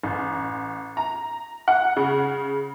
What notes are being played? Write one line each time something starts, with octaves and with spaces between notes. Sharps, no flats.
A1
A#5
F#5
C#3